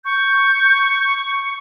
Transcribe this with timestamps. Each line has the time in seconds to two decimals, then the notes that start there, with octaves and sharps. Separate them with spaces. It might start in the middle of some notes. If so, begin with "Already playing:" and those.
0.05 C#6 G6